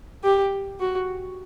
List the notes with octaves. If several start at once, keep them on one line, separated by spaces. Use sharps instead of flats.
G4
F#4